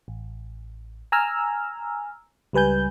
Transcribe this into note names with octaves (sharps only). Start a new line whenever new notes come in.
A1
G#5 A#5 E6 F6
C#2 G3 B4 G#5 G6